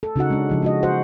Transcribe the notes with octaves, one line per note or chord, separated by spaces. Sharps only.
A4
C#3 D#4 F#4 F#5
G#3 D4
C#3 F3 E4
G#3 F#4 D#5
F#4 C5 F#5